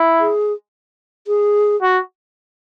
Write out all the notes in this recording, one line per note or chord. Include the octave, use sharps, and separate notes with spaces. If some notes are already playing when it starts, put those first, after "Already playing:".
Already playing: E4
G#4
G#4
F#4